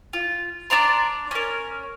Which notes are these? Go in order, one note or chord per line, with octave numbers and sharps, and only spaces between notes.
F4
D4 D5 A#5 C6
C#4 A#4